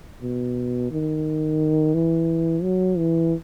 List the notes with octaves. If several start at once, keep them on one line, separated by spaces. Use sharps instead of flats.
B2
D#3
E3
F#3
E3